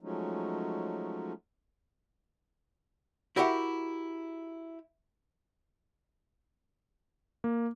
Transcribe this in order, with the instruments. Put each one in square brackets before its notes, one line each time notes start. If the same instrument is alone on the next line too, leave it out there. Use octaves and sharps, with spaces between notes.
[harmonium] F3 F#3 G#3 A3 C#4 D#4
[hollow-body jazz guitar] E4 F#4 G4 A#4 E5 F#5
[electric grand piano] A#3